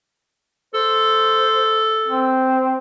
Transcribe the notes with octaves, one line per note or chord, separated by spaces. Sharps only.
A4 C5
C4